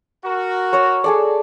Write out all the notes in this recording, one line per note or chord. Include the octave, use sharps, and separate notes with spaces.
F#4 A#4
C#5 E6
G#4 A4 D5